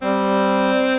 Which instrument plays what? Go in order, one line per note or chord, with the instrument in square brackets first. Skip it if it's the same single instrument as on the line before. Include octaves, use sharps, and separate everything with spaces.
[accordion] G3 [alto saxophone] C4